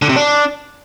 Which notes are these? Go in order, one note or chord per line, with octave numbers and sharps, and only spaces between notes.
D3
C3
D4